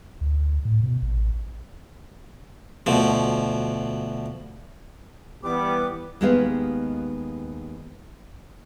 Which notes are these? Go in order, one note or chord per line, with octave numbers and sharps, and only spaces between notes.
D2
A2
B2
A1
D2 B2 F3
E3 G3 B3 D6
D#2 G#3 B3 G4 B4 F5